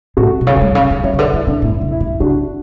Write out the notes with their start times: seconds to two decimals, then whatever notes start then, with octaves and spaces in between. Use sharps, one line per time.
0.17 A2 F#4 A4
0.41 B2
0.47 C#3 A4 C#5
0.56 A3
0.61 G#3
0.69 B2
0.75 C#3
0.90 D3
1.04 E3 C#5 E5
1.14 C#3
1.18 D3 G#4 B4
1.33 D3 E4
1.47 C#3 D4
1.62 A2 E4
1.81 C#3
1.91 E4
2.00 D3
2.20 C#3 D4 F#4